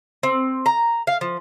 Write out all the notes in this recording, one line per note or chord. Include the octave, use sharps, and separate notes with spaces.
C4
A#5
F5
F3